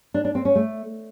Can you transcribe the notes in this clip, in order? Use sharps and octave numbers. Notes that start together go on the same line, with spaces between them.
D4
D4
C4
C#4
A3